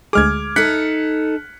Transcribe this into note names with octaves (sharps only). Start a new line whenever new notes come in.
D2 G#3 G#4 D6 F6 G#6
D#4 A4 F#6 B6 C#7